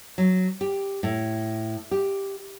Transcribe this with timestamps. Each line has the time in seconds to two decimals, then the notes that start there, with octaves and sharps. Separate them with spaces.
0.18 F#3
0.61 G4
1.03 A2
1.91 G4